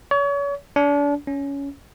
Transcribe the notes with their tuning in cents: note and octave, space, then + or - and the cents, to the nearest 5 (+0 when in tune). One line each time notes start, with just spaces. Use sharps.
C#5 +35
D4 -35
C#4 +15